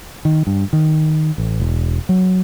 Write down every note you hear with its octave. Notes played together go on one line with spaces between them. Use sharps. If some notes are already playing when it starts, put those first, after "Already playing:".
D#3
G2
D#3
A1
E1
F#3